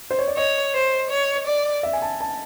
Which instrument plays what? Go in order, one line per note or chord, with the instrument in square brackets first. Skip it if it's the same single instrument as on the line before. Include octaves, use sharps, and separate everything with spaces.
[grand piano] C5
C#5
D5
[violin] C#5 [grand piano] D#5
[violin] C5
C#5
D5
[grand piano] E5
G#5
A5
A5